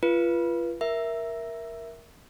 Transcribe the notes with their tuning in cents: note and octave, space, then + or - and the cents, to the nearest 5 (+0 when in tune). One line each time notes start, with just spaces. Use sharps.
F4 -30 B4 -20
A#4 +10 E5 +0